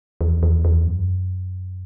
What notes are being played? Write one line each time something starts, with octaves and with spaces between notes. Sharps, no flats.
E2
E2
E2
F#2